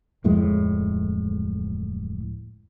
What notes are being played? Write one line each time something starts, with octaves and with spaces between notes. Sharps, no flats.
D1 F2 A2 G#3